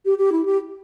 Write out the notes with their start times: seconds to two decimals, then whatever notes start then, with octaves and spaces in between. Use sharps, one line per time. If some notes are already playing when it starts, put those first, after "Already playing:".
0.05 G4
0.18 G4
0.32 E4
0.45 G4